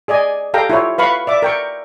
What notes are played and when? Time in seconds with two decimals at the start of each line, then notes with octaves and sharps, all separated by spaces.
0.08 G#4 D5 D#5 G#5
0.54 G4 A4 F5 G5 A#5
0.70 E4 F4 C#5
0.98 B4 F5 B5 C#6
1.27 D5 E5 D6
1.42 A#4 G5 C#6